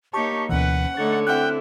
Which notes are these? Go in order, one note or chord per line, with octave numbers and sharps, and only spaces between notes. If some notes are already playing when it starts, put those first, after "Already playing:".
A#3 D#4 G4 C#5 A5 C#6
D2 B2 E3 C#4 B4 F#5
D3 A3 D#4 C#5 A6
C4 E4 F#5 G5 F6 F#6